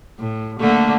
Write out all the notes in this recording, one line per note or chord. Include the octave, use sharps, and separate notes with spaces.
A2
D3 A3 A#3